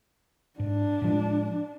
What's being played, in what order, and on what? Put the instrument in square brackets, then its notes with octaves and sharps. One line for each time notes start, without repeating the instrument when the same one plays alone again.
[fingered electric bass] G#2 [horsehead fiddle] D4
[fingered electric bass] A2 F3 G#3